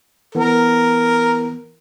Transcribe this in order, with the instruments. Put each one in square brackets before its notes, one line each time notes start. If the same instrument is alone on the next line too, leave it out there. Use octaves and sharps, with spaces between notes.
[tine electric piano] E3 B3 [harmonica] A#4